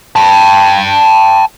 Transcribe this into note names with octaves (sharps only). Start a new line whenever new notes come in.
G5 A5